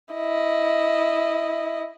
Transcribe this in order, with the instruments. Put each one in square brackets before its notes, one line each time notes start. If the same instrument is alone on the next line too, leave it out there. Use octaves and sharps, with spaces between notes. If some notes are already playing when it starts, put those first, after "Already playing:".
[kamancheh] E4 D#5